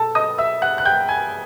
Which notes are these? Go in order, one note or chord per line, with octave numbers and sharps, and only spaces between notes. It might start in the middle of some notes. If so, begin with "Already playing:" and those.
Already playing: B2 A4 A5
D#5 D#6
E5 E6
F#5 F#6
F#6
G5 G6
G#5 G#6